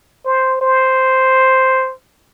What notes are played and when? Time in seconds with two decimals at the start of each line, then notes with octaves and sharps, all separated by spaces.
0.25 C5
0.61 C5